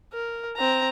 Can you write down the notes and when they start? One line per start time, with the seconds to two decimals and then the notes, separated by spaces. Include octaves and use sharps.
0.13 A#4
0.57 C4 A#5